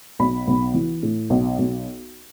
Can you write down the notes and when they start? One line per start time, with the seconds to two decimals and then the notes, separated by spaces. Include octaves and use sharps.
0.19 B1 B5
0.47 B1
0.74 E3
1.03 A2
1.30 B1
1.58 B1